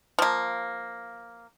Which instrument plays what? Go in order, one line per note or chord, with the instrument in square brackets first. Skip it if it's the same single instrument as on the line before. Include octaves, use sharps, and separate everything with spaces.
[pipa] F3 A#3